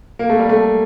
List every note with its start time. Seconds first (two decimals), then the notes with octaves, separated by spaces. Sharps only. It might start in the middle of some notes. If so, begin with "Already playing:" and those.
0.19 A#3
0.29 A3
0.39 G3
0.49 A3